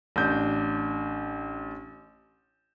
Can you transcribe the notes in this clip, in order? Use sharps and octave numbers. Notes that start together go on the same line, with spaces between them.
A1 D4 G6